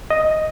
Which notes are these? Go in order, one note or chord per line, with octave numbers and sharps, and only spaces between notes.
D#5